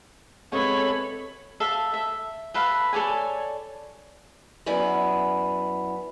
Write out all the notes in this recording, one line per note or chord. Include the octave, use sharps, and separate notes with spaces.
C3 G#3 B3 A4 C#5 B5
A4 E5 F5
E5
A4 B4 F5
A4 C#5 D5 G#5
F#2 B3 E4 D5 G#5